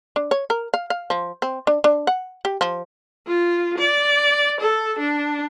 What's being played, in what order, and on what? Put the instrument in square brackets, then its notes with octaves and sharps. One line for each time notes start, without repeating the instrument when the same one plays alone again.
[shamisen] D4
C#5
A#4
F5
F5
F3
C4
D4
D4
F#5
G4
F3
[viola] F4
D5
A4
D4